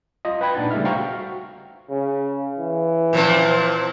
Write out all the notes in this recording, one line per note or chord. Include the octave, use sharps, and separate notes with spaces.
F4 D#5
B4 G5 B5 G#6
A#2 D4 D#4 F#5 A6
C#3 G3 A3 B3 E5 F6
C5 E5 F5 G5 A#5 C#6
F#4
C#3
E3
A#2 F3 C4